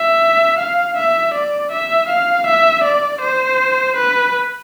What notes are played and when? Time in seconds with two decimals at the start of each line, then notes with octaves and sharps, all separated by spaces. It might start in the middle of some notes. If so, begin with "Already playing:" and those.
Already playing: E5
0.59 F5
0.97 E5
1.34 D5
1.72 E5
2.09 F5
2.46 E5
2.84 D5
3.21 C5
3.96 B4